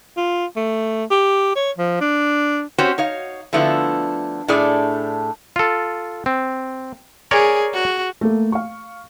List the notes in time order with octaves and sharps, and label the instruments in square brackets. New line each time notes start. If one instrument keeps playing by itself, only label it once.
[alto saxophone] F4
A3
G4
C#5
F3
D4
[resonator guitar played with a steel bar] C4 C#4 F#4 G4 C5 C#5
D#4 C#5 F5
D3 F3 A3 B3 E4 F4
A2 A3 D4 G#4 D5
[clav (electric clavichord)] F4 A4
C4
[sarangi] G#4 [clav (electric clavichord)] A#4 C#5 D5
[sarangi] F#4
[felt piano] A3 A#3 A4
F5 C#6